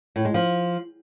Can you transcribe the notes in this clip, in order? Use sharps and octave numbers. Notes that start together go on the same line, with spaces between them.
A2
G#3
F3